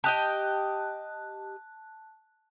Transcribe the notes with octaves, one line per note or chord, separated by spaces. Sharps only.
G4 D#5 G5 A5 F#6